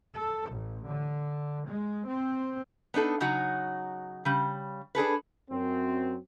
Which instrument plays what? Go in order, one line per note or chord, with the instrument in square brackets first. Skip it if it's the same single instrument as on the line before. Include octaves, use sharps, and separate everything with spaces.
[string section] A4
A1
D3
G#3
C4
[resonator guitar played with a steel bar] B3 D4 D#4 A4
C#3 F#3 D#4 F#4
C#3 G3
D4 G#4 A4 B4
[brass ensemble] F#2 C4